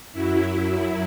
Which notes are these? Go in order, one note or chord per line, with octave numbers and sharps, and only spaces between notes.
F#2 F#3 E4